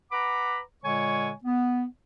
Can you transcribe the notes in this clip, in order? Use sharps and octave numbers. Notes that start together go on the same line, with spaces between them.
B4 F#5 A#5 B5 D6
A#2 D3 G#3 C#5 G#5 C#6
B3